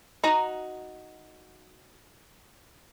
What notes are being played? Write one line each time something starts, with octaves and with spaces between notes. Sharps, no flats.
D#4 F#4 A#5